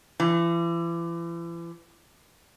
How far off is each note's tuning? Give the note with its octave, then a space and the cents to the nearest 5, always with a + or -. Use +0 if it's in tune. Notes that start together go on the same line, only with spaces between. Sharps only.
E3 +40